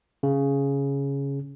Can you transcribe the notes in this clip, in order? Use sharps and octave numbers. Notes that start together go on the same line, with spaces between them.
C#3